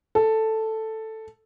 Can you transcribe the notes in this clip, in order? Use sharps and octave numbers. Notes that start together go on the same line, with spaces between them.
A4